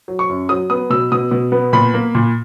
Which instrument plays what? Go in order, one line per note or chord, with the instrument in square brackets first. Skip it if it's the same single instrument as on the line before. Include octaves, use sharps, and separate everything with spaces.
[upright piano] F#3
C#6
F#2
F#3 D#6
B3 D#6
B2 E6
B2 D#6
B2
B3
A#2 B5
A#3
A#2